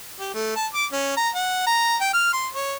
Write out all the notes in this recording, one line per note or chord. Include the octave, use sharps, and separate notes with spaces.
G4
A3
A5
D6
C#4
A#5
F#5
A#5
G5
F6
C6
C#5